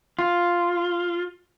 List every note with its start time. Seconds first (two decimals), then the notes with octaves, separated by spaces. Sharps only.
0.19 F4